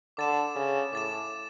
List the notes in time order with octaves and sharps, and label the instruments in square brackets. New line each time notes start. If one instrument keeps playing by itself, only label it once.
[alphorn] D3 [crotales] D6 A6 E7
[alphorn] C#3
[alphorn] A2 [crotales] D6 A6 E7